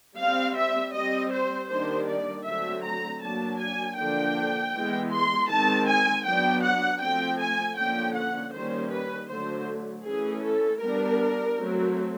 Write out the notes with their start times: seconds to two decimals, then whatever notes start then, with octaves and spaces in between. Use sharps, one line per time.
0.17 G3 C4 F5
0.55 E5
0.93 G3 C4 D#5
1.31 C5
1.69 D#3 G3 A#3 D4 C5
2.08 D5
2.45 D3 F#3 A3 C4 E5
2.83 A#5
3.21 F#3 A#3 D4 A5
3.59 G#5
3.97 D3 F3 A#3 D4 G5
4.73 E3 G#3 B3
5.11 C6
5.49 D#3 G#3 C4 A5
5.87 G#5
6.25 F#3 B3 D4 G5
6.63 F#5
7.01 F3 A3 C4 G5
7.39 G#5
7.77 D3 F3 A#3 C#4 G5
8.15 F#5
8.53 D#3 G3 A#3 C#4 C5
8.91 B4
9.29 D3 F#3 A3 C5
10.05 E3 A3 C#4 G#4
10.43 A4
10.81 G3 B3 D4 A#4
11.57 F#3 A3 C4